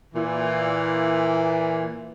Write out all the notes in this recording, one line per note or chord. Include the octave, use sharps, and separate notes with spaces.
A#2 E3